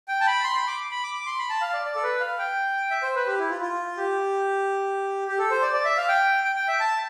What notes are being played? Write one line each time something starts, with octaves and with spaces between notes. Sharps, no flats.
G5
A5
B5
C6
B5
D6
B5
D6
D6
C6
B5
A5
F5
D5
D5
A4
B4
F5
G5
E5
C5
B4
G4
E4
F4
F4
G4
G4
A4
C5
D5
D5
E5
F5
G5
G5
G5
E5
A5